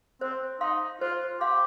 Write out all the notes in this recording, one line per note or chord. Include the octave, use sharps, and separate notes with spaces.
C4 C5
D#4 F5 C6
F4 C5
G4 F5 C6